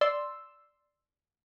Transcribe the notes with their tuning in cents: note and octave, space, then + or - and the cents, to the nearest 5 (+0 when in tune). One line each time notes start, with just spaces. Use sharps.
D5 +0 C6 +0 E6 +0